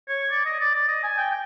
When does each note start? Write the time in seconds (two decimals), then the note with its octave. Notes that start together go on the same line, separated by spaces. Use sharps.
0.09 C#5
0.31 D5
0.46 D#5
0.60 D5
0.75 D5
0.89 D#5
1.03 G#5
1.18 G5
1.30 G5